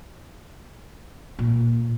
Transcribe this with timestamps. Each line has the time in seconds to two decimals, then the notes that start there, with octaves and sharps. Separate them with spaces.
1.39 A#2